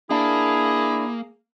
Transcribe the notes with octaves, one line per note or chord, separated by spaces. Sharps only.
A#3 D4 E4 G#4